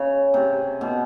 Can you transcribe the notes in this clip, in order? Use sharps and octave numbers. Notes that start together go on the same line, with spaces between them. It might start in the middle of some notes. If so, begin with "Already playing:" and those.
Already playing: C#3
C3
B2